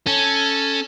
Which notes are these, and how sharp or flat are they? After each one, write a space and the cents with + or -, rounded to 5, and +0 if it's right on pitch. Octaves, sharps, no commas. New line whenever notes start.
C#4 +0 A4 +0